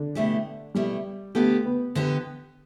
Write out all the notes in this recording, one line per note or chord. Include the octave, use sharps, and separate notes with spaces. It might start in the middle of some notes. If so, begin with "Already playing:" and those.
Already playing: D3
B2 A3 E4 G4
B2 G3 A3 E4 G4
D3 A3 B3 G4
B3
D3 B3 G4